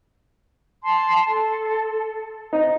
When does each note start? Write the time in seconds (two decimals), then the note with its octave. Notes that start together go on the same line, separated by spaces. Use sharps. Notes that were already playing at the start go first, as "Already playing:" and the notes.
0.83 A5 C6
1.27 A4
2.53 D#4